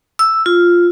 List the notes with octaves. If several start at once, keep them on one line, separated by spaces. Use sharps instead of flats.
E6
F4